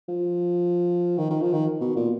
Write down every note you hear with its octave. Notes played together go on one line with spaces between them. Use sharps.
F3
D#3
D#3
F3
D#3
B2
A#2